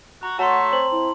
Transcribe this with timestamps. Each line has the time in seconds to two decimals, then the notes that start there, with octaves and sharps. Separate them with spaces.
0.23 F#4 A#5
0.39 A3 F#4 C#5 A5 A#5 C6
0.73 C4 F#7
0.92 E4